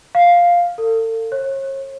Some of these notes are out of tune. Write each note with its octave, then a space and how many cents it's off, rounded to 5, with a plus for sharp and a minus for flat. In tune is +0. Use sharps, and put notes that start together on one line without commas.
F5 +0
A4 +40
C#5 -40